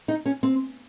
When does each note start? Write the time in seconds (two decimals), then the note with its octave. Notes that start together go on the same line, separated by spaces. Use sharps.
0.08 D#4
0.26 C#4
0.43 C4